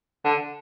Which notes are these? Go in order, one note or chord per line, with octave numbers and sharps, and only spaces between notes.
D3